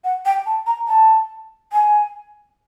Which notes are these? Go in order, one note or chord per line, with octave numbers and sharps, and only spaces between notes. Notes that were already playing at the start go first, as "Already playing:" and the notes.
F#5
G5
A5
A#5
A5
G#5